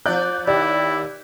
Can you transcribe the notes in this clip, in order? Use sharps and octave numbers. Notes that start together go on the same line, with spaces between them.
F3 D5 F#6 G6
D#2 E4 G4 D5